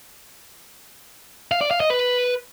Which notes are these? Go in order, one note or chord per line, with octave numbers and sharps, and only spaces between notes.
F5
D5
F5
D#5
B4